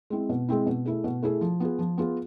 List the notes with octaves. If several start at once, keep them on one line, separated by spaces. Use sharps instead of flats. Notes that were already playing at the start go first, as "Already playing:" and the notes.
G#3 C4 E4
B2
G#3 C4 E4
B2
A3 E4 G#4
B2
A3 E4 G#4
F3
B3 F4 G#4
F3
B3 F4 G#4